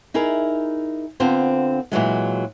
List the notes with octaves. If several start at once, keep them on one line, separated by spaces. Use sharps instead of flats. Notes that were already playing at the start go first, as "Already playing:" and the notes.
D#4 E4 G#4 A#4
D3 B3 C4 F4 C5
A#2 E3 F#3 G#3